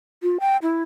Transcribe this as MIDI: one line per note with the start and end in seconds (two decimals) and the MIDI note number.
0.23 0.38 65
0.40 0.57 79
0.62 0.83 64